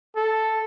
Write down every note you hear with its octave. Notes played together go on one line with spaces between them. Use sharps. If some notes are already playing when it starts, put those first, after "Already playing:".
A4